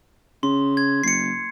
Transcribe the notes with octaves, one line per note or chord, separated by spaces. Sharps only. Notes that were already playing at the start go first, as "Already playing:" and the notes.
C#3 C6
G#6
F#1 C7 C#7